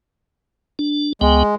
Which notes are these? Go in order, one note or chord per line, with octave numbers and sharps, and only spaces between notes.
D4
C#2 G#3 B3 G5